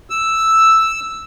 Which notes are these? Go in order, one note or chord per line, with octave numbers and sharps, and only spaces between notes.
E6